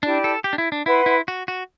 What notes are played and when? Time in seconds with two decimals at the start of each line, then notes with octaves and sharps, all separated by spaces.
0.03 D4 E4 G4 D5 A5
0.24 A4
0.44 G4
0.53 D4
0.58 E4
0.72 D4
0.86 E4 B4 F#5 C6
1.06 E4
1.28 F#4
1.48 F#4